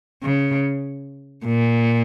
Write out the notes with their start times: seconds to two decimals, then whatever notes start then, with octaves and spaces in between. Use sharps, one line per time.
0.23 C#3
1.46 A#2